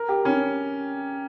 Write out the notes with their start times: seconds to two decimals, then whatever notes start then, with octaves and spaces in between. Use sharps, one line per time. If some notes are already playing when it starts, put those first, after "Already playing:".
Already playing: A#4
0.09 G4
0.25 C#4